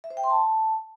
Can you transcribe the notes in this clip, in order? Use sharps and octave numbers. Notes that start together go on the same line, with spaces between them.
E5
C5
G5
C6
A5